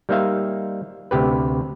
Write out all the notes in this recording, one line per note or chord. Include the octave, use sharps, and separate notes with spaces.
G3 A#3 D#4 C5 E5 F5
D2 C3 G4 B4